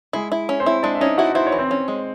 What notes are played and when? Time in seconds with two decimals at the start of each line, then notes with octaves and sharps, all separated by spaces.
0.13 G#3 E4 G#4
0.32 E4
0.49 C#4
0.60 C4 C5
0.66 E4
0.83 G#3 D4 D5
0.95 E5
1.01 C#4 D#4 D#5
1.18 E4 F#4 F#5
1.35 E4 C5
1.47 C#5
1.52 E3
1.59 C4 C5
1.71 C#4
1.88 G#3